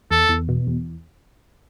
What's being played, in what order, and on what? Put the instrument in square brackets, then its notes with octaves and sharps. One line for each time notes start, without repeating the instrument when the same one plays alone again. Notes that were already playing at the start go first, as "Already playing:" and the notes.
[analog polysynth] E2 [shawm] A4
[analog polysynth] E2
B2
E2